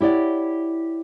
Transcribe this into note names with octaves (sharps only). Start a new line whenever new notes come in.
E4 G4 C#5 D5 F#5